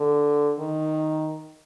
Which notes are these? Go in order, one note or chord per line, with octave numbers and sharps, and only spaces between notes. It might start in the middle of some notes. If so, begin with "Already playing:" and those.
Already playing: D3
D#3